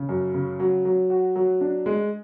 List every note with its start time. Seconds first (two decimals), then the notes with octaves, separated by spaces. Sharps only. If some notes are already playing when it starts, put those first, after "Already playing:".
Already playing: C#3
0.09 F#2
0.34 C#3
0.60 F#3
0.85 F#3
1.10 F#4
1.36 F#3
1.61 D4
1.86 G#3